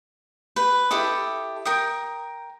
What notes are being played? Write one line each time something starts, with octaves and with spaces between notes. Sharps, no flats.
B4
E4 G4 A4 D#6
A#4 G5 D#6